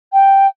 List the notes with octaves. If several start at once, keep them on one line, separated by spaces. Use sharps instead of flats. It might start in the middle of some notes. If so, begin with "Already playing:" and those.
G5